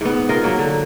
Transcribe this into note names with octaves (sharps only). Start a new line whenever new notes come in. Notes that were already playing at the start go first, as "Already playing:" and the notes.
G#2 B3
F4 G#4 A#4 D#5
F#3 A#3
D3